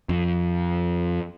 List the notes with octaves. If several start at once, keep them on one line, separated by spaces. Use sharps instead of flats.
F2